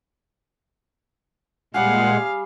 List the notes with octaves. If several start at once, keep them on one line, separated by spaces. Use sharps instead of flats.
A#2 G3 G#3 G#4 F5 F#5 G#5